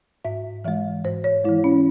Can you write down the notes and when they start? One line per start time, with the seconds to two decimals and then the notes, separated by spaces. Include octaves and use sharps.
0.25 G#2 E5
0.64 E3 G#3 E5
1.04 G#2 C5
1.24 C#5
1.44 E3 G#3 E4
1.64 C#4